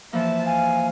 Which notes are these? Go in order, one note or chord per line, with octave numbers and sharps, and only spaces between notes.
E3 F3 A#3 E5 A5
F5 G#5